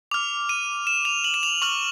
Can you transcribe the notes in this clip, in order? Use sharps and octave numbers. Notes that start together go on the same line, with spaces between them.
D6 F6 F7
D#7
E7
F7
F#7
E7
F7
C#6 F6 F#7